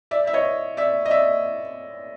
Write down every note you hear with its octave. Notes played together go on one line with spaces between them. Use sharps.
D5 E5
E5
C#5 D#5
D5 E5
D#5
D5 E5